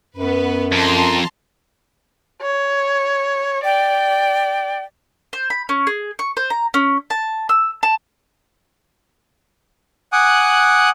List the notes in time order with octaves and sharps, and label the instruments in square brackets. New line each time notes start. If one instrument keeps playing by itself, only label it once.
[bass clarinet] F#2 [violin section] B3 B4
[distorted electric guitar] F2 [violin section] A5 A#5 C6
[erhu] C#5
[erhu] D5 [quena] G5
[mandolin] C5
B5
C#4
G#4
C#6
C5
A#5
C#4
A5
E6
A5
[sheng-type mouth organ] F#5 G#5 D6 D#6 F#6